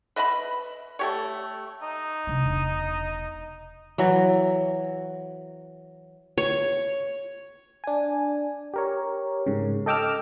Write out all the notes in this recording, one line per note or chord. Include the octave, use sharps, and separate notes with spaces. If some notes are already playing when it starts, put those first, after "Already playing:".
B4 D#5 E5 B5
A3 G4 C#5
D#4
C3 D4
E1
E3 F#3
C#5
D4 G#5
G4 A#4 C#5
G#2 C#3
A4 D#5 G5 D6 E6 F6